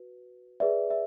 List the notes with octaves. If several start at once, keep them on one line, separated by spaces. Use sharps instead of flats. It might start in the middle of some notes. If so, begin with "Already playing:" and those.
Already playing: F#4 B4
G#4 B4 D5 E5
E5